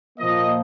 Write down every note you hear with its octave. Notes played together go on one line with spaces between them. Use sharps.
A#2 F3 A#3 D#5